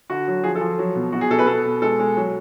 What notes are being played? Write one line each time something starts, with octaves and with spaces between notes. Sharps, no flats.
D3 F#4
F#3
F3 G#4
A4
F3
F#3
B2
B2 F#4
G#4
B2 A4
B4
B3 A4
B2
G#3 A4
G#3
F#3